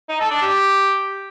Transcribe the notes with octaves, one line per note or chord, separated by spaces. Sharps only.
D#4
A4
D4
G4